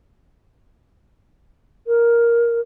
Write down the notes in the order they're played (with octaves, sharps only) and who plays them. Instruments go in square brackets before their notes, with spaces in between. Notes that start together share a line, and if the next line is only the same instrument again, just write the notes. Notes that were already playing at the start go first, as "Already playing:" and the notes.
[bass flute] A#4